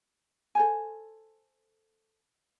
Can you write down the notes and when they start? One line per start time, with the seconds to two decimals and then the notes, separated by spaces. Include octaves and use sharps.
0.55 A4 C5 G#5